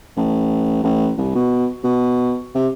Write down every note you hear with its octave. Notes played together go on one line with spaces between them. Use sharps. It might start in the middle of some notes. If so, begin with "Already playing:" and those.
A1
A1
C2
B2
B2
C3